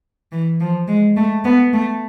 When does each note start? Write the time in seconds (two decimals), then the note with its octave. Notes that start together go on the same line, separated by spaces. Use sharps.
0.32 E3
0.60 F3
0.88 G#3
1.16 A3
1.44 B3
1.73 A3